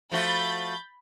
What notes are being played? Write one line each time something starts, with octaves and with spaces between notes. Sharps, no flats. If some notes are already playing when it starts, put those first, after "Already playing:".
F3 A3 F#4 B5 G6 A6